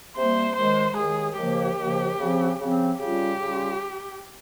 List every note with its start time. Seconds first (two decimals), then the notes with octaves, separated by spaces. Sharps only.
0.16 C3 G3 A#3 C5
0.56 D#2 D#3 G#3 C5
0.97 D#2 D#3 G#3 G#4
1.37 D#2 C#3 F3 A#3 G4
1.78 D#2 C#3 F3 A#3
2.19 C#3 F3 C4
2.59 C#3 F3 C4
3.00 C#3 G3 C#4 F4 G4
3.40 C#3 G3 C#4 F4